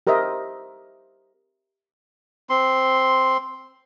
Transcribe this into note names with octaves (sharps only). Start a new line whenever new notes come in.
G4 A#4 C5 D#5 E5
C4 C6